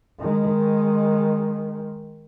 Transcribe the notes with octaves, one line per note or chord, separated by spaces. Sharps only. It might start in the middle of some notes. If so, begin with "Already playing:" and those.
D#3 G#3